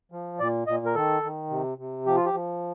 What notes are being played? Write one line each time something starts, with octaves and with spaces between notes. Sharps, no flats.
F3
A#2 D5
A#2 D#5
A#4
D#3 A4
D#3
C3
C3
F3 G4
F4
G4
F3